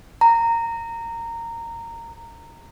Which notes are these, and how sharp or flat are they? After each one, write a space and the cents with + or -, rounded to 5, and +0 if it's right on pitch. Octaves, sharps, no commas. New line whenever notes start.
A#5 -15